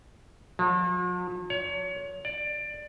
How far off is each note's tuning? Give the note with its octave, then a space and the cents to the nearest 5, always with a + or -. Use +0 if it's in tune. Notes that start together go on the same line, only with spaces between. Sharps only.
F3 +45
C#5 +30
D5 +15